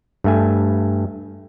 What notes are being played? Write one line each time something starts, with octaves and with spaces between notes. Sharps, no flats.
G2 A3 G#5